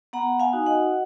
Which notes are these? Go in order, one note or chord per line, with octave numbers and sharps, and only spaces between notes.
B3 F#5 A#5
F5 G#5
D#4 F#4
D#5 F#5